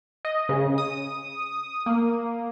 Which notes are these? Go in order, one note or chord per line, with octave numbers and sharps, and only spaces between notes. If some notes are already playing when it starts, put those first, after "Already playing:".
D#5
C#3
D#6
A#3